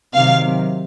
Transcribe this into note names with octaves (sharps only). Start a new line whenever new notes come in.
C3 D#3 F#3 F5